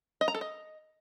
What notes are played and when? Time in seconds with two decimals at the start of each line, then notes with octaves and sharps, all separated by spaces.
0.21 D#5
0.28 A#5
0.34 A4
0.41 D#5